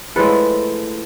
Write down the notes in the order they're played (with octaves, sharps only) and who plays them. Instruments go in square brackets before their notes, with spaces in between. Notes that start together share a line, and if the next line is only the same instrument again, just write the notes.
[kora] A2 F3 G#3 A4 B4